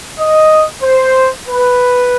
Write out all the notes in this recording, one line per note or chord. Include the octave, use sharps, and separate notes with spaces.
D#5
C5
B4